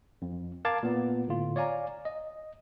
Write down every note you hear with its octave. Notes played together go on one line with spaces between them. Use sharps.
F2
A#4 F5 A5 D6 G#6 A6
A#2 B3
A2 D3 F4
C#5 D5 F5 G#5 A#5
D#5